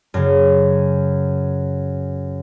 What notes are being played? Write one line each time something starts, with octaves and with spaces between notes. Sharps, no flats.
F#2 C#3